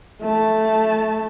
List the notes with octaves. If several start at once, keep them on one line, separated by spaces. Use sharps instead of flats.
A3 A5